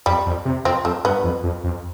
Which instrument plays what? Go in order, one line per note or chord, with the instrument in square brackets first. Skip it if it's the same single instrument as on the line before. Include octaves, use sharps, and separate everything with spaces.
[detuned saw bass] F2 [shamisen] G3
[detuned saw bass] F2
C3
[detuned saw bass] F2 [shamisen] C4
[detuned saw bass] F2 [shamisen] A3
[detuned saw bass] G2 [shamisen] B3
[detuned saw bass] F2
F2
F2